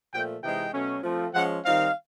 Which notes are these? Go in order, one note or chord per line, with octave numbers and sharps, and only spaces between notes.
A#2 F3 A3 G5
C3 E3 G#3 C4 D#4 G5
B2 F#3 A3 C#4
F3 A3 C4
F3 G#3 C#4 F#5
D#3 G3 C4 D#4 F5